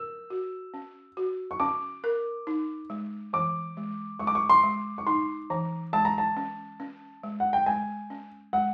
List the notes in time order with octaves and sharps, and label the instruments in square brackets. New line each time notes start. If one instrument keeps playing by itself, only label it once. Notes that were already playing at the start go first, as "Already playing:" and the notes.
Already playing: [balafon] A#4 [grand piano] E6
[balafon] F#4
C#4
F#4
[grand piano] C#6
[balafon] C#4 [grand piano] D6
[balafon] A#4
D#4
G#3
[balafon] E3 [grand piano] D6
[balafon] G#3
[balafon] G#3 [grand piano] C#6
[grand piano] D6
C#6
C6
[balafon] G#3
[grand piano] C#6
[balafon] D#4 [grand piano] C6
[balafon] E3 [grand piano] A#5
[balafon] G#3 [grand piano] A5
[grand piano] A#5
A5
[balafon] C#4
C#4
G#3
[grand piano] F#5
G5
[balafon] G#3 [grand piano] G#5
[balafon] C#4
[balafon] G#3 [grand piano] F#5